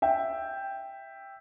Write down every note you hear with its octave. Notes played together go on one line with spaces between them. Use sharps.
E5 G5